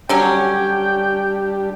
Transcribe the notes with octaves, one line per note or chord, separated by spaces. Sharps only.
D3 F#3 G3 C#4 D4 G4 G5